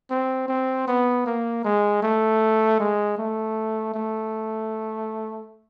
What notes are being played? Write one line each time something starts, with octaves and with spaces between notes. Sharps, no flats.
C4
C4
B3
A#3
G#3
A3
G#3
A3
A3